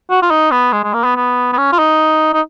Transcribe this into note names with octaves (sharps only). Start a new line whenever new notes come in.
F#4
F4
D#4
B3
G#3
G#3
A#3
B3
B3
B3
C#4
F4
D#4
D#4